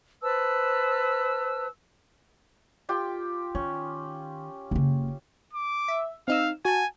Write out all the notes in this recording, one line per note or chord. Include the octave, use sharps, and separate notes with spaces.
B4 C5 A5 E6
F4 G4 G5
D#3 C#4
F#1 C#3
D6
E5
C4 D#4 F5 E6
F#4 G#5 A5